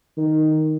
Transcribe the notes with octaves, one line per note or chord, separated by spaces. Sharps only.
D#3